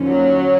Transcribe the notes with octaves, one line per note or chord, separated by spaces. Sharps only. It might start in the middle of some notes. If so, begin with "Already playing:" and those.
Already playing: D#2 D3 F3 A#3 C#4
F#3